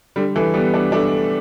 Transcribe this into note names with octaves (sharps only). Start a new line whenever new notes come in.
D3 G3
E3 A3
G3 B3
A3 D4
A3 D4